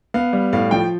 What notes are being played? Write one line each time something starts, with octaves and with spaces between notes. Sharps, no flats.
B3 F5
G3
A2 F5
F3 G5